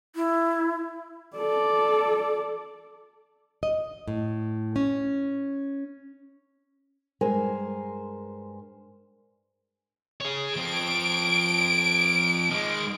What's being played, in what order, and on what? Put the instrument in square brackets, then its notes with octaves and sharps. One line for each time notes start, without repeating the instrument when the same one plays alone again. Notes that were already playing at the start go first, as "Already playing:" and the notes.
[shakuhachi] E4
[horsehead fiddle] A4 D5
[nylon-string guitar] D#5
A2
C#4
[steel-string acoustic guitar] G2 G#3 A#4 C5 G#5
[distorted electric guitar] G#4 C#5
[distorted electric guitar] F3 C4 [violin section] D7
[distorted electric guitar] D#3 G#3